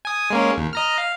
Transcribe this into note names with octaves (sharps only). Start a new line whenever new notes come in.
G#5 D#6
G#3 A#3 C#4
D#2
D#5 A#5 F6
F5